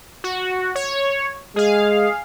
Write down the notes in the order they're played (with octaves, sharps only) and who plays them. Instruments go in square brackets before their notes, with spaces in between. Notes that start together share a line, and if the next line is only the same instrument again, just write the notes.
[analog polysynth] F#4
C#5
[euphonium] G#3 [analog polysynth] G#4 F5